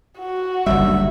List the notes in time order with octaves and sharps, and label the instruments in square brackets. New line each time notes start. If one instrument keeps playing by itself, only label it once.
[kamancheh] F#4
[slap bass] F#1 D2 G3 [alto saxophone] E5